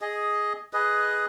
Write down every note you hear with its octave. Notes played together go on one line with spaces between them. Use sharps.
G#4 D#5
G#4 B4 D#5